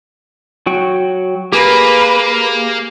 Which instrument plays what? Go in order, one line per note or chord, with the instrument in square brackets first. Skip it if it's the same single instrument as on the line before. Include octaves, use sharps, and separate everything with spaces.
[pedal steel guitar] F#3 F#4 G5
[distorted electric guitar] A#3 [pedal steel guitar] G4 G#4 A#4 [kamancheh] B4